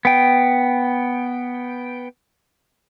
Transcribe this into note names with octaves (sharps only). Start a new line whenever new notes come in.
B3 G5